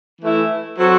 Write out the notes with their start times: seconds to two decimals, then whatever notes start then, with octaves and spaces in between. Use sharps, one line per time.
0.21 E3 A3 E4
0.78 F#3 C4 F#4 A4 C5